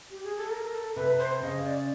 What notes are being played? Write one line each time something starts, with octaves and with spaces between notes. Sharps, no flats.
G4
G#4
A4
A#4
A4
C3 B4
C5
C#3 D#5
D5